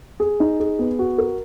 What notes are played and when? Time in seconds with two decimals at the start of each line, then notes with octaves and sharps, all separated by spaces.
0.20 G#4
0.40 D#4
0.60 G#4
0.79 B3
0.99 F#4
1.18 A#4